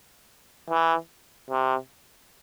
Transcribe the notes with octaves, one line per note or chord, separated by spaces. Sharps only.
E3
C3